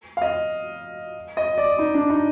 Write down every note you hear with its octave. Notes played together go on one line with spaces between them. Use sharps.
F5
D#5
D#5
D5
D#4
D4
D#4